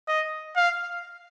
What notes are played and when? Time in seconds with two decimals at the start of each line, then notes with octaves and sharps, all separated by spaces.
0.08 D#5
0.56 F5